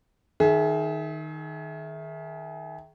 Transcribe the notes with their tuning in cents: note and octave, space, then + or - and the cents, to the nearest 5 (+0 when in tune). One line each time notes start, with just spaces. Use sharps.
D#3 +0 G#4 +30 E5 -10